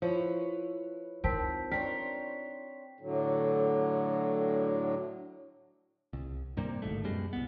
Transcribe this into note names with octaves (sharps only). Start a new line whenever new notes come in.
F3 E4 B4 C#5
C4 D#4 F4 A#4 A5 B6
D4 A#4 C5 C#5 G5 B6
A2 D3 F#3
C2
G2 C3 G3 A#3
D1 G#1 G#2 A3
F#2 B2 G3 G#3
C2 B3